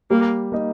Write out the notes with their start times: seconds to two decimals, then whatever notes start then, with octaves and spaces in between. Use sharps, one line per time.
0.10 G3 A#3
0.52 A#3 D#4